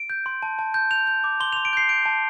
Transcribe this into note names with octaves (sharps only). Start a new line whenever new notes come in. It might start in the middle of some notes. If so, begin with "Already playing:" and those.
Already playing: D7
G6
C6
A5
A5
G6
G6 F7
G6
D6
C6 G7
C6 F7
D7
G6 C7
G6 D7
A5